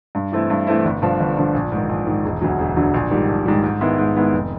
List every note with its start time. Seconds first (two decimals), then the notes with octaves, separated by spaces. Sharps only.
0.15 G2
0.32 E3 A3 C4 E4
0.50 G2
0.67 E3 A3 C4 E4
0.85 G1
1.02 G2 D3 F3
1.20 G1
1.37 G2 D3 F3
1.54 A#1
1.72 G#2 D#3
1.89 A#1
2.07 G#2 D#3
2.25 E1
2.41 D2 D3 F#3
2.59 E1
2.76 D2 D3 F#3
2.94 A#1
3.11 G#2 D#3 G3
3.29 A#1
3.46 G#2 D#3 G3
3.64 G#2
3.81 D#3 G#3 B3 E4
3.98 G#2
4.16 D#3 G#3 B3 E4
4.33 F1